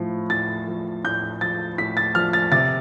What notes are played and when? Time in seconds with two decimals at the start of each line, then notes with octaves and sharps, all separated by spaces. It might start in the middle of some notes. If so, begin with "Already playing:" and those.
Already playing: A2 F3
0.30 A2 A6
0.67 F3
1.04 A2 G6
1.41 F3 A6
1.78 A2 B6
1.97 A6
2.15 F3 F6
2.33 A6
2.52 C3 A6